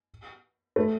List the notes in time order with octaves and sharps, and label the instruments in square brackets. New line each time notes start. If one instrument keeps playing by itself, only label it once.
[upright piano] A3